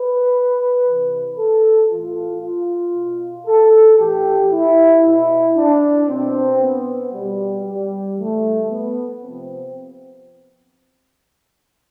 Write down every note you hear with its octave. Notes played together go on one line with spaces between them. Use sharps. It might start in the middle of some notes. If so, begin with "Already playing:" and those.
Already playing: B4
C3 E3
A4
A2 E3 F4
F4
B2
A4
A2 E3 G4
E4
B2 E4
D4
B2 C4
B3
B2 G3
G3
A2 E3 A3
B3
C3 F3 C4